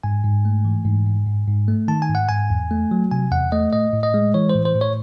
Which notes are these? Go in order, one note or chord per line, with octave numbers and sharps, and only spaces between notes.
G#2 G#5
G#2
A3
E3
G#2
G#2
G#2
G#2
A3
D#3 A5
G#5
G#2
F#5
G#2 G#5
E2
A3
F#3
C3 G#5
E2 F#5
A3 D#5
A2 D#5
A2
D#5
G#3
E3 C#5
C5
A2
C5
A2
C#5